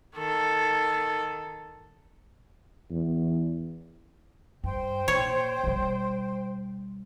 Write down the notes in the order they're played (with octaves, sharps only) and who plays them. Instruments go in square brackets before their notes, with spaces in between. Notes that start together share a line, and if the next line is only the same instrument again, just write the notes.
[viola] D#3 A4
[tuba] E2
[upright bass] G2 [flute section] C5 G5
[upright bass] A#2 [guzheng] C#5
[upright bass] B2 G3